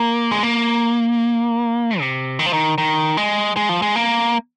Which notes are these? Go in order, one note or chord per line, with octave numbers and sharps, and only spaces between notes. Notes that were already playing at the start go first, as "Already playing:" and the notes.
Already playing: A#3
G#3
A#3
C3
D#3
F3
D#3
D#3
G#3
G#3
F3
G#3
A#3